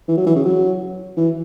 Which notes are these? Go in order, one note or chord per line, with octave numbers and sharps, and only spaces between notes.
E3
F#3
E3
C#3
F#3
E3